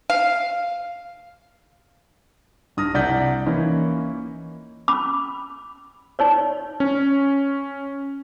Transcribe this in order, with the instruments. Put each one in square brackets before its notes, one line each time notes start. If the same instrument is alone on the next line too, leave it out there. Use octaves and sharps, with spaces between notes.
[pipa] F5
[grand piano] G2 D#6 F6 A#6
C2 D5 F#5 G6 B6
E3 A#3 C#4 D#4
[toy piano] C#4 B5 D6
D#4 C#5 D5
[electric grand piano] C#4